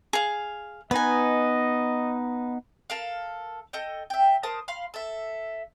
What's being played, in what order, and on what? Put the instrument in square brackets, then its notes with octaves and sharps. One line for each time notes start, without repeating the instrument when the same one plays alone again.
[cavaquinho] G#4 F5
[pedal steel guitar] B3 D#4 [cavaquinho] B4 G#5 [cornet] D#5
[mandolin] A4 A#4 F5
A4 D#5 G5
E5 G5
A#4 C5 A5 D#6
F5 B5 C6
A4 E5